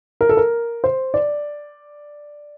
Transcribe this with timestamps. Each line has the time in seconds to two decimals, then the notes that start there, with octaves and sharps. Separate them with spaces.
0.21 A#4
0.29 A4
0.37 A#4
0.84 C5
1.14 D5